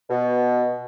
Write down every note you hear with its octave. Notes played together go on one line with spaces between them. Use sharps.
B2